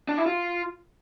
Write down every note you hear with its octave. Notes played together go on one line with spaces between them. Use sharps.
D4
E4
F4